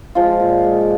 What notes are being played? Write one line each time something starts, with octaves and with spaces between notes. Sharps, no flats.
F3 G#3 F4
A#2
G#3